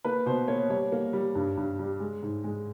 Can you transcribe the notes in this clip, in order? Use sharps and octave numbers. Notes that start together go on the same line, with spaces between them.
A#3 B4
B2 C5
A#3 C#5
G3 C#5
A#3
G3
G2
G2
G3
G#3
G#2
G#3